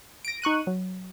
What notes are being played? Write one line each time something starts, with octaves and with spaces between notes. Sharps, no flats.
A#6 D7
D#4 C#6 F#6 D#7
F#3